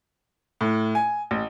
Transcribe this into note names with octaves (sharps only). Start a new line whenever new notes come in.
A2
G#5
A1